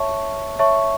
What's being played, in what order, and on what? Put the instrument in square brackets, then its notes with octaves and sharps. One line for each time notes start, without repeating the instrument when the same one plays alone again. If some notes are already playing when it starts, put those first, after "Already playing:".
Already playing: [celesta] C#5 E5 A5 C#6
C#5 E5 A5 C#6